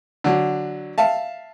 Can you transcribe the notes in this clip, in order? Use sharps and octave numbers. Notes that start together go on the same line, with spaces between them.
D3 F#3
E5 F5 A5